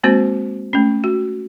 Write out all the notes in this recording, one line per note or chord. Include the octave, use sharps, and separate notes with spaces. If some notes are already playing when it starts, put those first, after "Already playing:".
G#3 A#3 C4 F#4 C5
A3 C#4
F#4